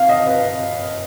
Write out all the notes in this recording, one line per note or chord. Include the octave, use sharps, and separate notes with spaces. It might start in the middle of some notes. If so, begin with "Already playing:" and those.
Already playing: F5
D#5
B4